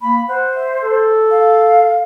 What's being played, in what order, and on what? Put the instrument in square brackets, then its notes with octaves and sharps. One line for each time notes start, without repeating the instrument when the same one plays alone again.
[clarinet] A#3 [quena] B5
[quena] C5 [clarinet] F#5
[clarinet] E5
A4
[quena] F5